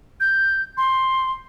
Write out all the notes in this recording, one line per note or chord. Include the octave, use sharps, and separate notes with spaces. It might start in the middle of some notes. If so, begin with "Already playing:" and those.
G6
C6